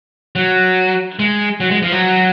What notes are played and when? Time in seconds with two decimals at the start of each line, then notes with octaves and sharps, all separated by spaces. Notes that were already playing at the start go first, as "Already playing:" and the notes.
0.36 F#3
1.19 G#3
1.60 F#3
1.71 G#3
1.82 F3
1.92 F#3